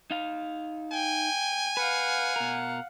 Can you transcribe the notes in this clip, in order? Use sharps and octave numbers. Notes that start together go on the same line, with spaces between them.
D#4 F5
G5 G#5
B4 F5 F#5
B2 A#4